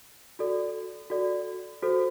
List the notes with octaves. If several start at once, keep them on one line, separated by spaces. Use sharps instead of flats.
F#4 A4 D5
F#4 A4 D5
F#4 A4 C5